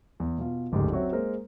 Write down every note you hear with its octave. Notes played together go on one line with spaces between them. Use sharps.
E2
B2 F4
F#1 D2 G#2 G4
F#3 C4 F#4 C#5 E5
G#3 A#3 A#4 C5